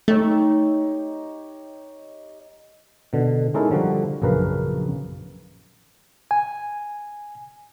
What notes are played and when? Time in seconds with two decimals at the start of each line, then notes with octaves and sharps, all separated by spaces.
0.08 A3 D#4 G4 C#5
3.13 B2 D3
3.54 G#3 C#4 D#4 E4 A4 A#4
3.71 D3 F3 G3 F#4
4.22 A#1 F#2 C#3 A#4 B4 F5
6.31 G#5